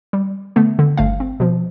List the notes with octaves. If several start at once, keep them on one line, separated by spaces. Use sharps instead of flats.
G3
D3 A3 B3
D3
G1 A3 F5
C4
B2 F3